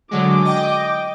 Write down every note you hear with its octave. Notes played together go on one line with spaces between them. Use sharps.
D3 F#3 G#3 D6
D#5 G5